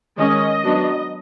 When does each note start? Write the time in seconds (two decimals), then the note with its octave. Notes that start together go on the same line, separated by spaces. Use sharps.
0.18 D#3 G#3 C#4 D#5
0.64 F#3 B3 D4